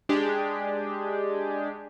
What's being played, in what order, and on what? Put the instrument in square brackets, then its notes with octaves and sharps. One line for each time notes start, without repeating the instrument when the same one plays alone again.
[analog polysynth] G#3 D4 G4 G#4